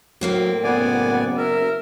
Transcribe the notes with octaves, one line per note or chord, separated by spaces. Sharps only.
A2 F#3 A#3 C4
F#1 B3 D5 G#5
A#4 E5